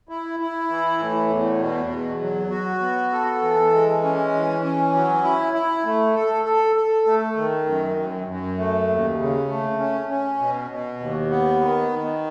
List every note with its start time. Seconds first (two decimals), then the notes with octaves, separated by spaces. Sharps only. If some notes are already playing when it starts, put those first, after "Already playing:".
0.09 E4
0.40 E4
0.70 E3
0.99 A2
1.30 E2
1.60 B2
1.90 E2
2.21 F#3
2.51 F#4
2.81 B3
3.12 A4
3.42 E3
3.73 G#3
4.03 C#4
4.33 E3
4.64 C#4
4.94 F#3
5.23 E4
5.54 E4
5.85 A3
6.14 A4
6.45 A4
6.76 A4
7.06 A3
7.36 D#3
7.66 F#2
7.96 F#2
8.27 F#2
8.58 A3
8.88 D#2
9.18 C#3
9.48 A3
9.79 C#4
10.09 C#4
10.39 B2
10.70 B2
11.00 D#2
11.31 B3
11.61 D#3
11.91 D#3